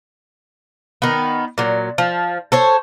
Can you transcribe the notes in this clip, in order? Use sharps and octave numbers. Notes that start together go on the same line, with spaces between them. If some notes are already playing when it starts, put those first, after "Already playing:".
D#3 B3
A#2 F#3
F3
A4 C5 C#5